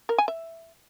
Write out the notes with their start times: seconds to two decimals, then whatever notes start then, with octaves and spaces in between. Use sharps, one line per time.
0.09 A#4
0.18 G#5
0.28 E5